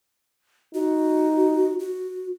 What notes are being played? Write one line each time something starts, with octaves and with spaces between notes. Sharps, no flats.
D#4 F#4
F#4